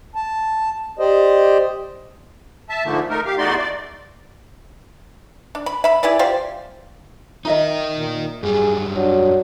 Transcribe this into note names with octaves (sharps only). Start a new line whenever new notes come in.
A5
G4 C5 D5 D#5
E5 A5
G#2 D3 F3 A3 A#3
A3 D#4 A#4
G4 F5
E2 A3 D#4 F#4 D5 C6
D5
D4
B5
E5 B5
E4 G#4 B4 D5
F4 G4 C5 D5
D#4 A#4 D#5 E5 A#5
A#2
F#2 G3 G#4
F#3 D4